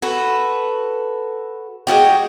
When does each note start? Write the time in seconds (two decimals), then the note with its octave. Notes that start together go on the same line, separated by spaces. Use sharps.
0.02 F#4 A4 B4
1.87 G#3 A#3 F#4 G4